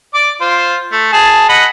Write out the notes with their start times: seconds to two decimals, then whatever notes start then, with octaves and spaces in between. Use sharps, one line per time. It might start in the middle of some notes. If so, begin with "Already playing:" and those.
0.14 D5 D6
0.41 F4 C5
0.92 A3
1.13 G#4 A5
1.49 D#5 F#5 B5